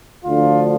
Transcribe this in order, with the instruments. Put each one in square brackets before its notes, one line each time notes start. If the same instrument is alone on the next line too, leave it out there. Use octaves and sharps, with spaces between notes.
[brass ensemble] D2 D3 F3 F4